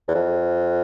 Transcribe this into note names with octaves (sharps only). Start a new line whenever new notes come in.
E2
F2